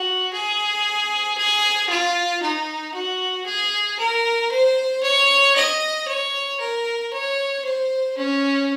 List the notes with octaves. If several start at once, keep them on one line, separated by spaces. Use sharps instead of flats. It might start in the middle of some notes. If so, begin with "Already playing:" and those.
Already playing: F#4
G#4
G#4
F4
D#4
F#4
G#4
A#4
C5
C#5
D#5
C#5
A#4
C#5
C5
C#4